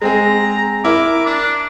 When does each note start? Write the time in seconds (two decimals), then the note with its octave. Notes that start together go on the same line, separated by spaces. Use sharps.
0.02 G#3 C4 G#4 A#5
0.85 E4 A#4 D6
1.26 D4